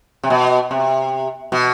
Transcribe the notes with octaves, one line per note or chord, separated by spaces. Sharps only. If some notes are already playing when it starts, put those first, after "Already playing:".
C3
B2
C3
B2